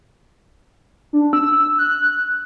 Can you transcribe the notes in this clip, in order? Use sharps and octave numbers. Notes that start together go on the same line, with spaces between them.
D4
E6
F#6